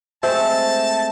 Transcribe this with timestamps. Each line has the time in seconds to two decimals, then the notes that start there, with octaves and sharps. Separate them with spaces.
0.23 G#3 A3 C4 E5 A5